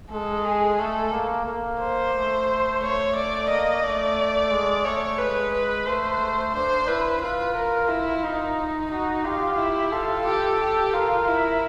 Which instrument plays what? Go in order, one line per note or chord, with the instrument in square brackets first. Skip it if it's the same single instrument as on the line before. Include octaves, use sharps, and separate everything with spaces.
[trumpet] G#3 [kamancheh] A4
[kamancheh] G#4
[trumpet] A3 [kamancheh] A4
[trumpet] A#3
A#3
[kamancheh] C5
[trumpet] A3
[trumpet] A3 [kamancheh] C#5
[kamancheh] D5
[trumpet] A#3 [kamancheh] D#5
[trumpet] A3 [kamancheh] D5
[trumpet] G#3
[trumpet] A3 [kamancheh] C#5
[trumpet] G#3 [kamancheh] B4
[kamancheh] B4
[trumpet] A3 [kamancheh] C5
[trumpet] D4 [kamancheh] C5
[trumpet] E4 [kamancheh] B4
[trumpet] F4 [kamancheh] B4
[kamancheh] A#4
E4
D#4
[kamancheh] D#4 [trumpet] F#4
[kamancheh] F4 [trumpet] G4
[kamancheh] E4
[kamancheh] F4 [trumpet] A4
[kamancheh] G4
G4
[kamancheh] F4 [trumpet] A#4
[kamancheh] E4